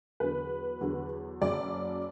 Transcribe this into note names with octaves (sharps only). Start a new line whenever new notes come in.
E2 D3 F#3 B4
E2 D3 F#3
F#1 F#2 F#3 D5